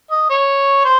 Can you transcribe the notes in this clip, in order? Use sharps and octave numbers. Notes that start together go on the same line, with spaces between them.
D#5
C#5
C5